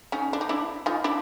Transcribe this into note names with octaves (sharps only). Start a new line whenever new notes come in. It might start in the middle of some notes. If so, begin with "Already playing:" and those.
C#4 D#4
D4
D#4
D4 E4
D#4 F4
D4 E4